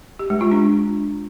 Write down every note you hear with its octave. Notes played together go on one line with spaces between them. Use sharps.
G4
G#3
F4
D4